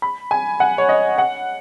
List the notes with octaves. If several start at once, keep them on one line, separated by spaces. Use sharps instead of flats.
B5
G#5
F#5
C#5
D#5
F#5